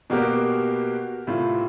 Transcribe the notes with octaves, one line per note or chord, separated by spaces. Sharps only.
B2 A#3 F#4 G4 A#4
A2 C3 F4